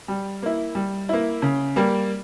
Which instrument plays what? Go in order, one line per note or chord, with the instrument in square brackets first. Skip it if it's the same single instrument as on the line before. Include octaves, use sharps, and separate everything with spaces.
[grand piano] G3
A#3 E4
G3
A#3 E4
C#3
G3 A#3